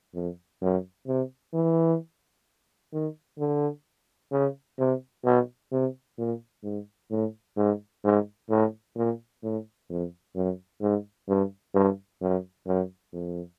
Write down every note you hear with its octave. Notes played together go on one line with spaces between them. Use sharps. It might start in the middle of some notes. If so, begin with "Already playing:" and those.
F2
F#2
C3
E3
D#3
D3
C#3
C3
B2
C3
A#2
G#2
A2
G#2
G#2
A2
A#2
A2
F2
F#2
G#2
G2
G2
F#2
F#2
F2